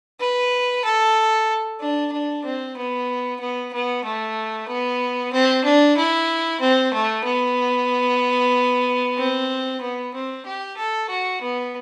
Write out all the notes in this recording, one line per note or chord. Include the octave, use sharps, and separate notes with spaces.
B4
A4
D4
D4
C4
B3
B3
B3
A3
B3
C4
D4
E4
C4
A3
B3
C4
B3
C4
G4
A4
F#4
B3